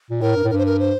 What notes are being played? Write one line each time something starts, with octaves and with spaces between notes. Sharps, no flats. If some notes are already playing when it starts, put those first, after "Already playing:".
A#2
A2 A#4
G2
A2
G2 A#4
C5
A#4
C5